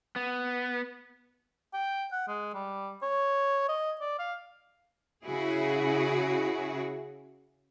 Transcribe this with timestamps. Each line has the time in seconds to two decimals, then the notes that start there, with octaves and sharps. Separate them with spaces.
0.16 B3
1.74 G5
2.12 F#5
2.28 G#3
2.54 G3
3.02 C#5
3.69 D#5
4.01 D5
4.19 F5
5.23 C#3 E4 F#4 G#4